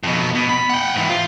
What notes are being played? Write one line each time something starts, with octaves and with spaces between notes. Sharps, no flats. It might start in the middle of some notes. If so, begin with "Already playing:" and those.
F2 B2
B2
B5
F#5 G5
G#2 E3
F4